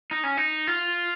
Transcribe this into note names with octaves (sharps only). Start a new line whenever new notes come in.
D#4
C#4
D#4
F4